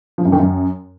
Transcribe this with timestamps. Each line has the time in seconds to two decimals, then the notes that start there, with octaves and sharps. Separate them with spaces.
0.18 F3
0.25 F#2
0.32 D#3
0.39 F#2